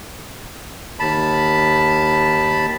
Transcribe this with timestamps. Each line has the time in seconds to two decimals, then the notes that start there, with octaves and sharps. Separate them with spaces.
1.00 D#2 A5 B5